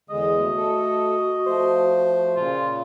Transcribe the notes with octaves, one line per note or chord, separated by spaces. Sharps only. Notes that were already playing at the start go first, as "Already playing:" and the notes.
E2 D3 G#3 D#5
A3 F#4
A4
F3 A3 C5
A#2 C#3 F4